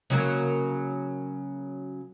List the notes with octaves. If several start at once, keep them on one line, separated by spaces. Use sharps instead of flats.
C#3 F#3 A#3